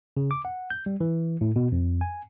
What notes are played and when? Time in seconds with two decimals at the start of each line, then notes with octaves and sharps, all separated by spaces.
0.17 C#3
0.31 D6
0.45 F#5
0.70 G6
0.86 G3
1.00 E3
1.41 A2
1.56 B2
1.72 F2
2.01 G#5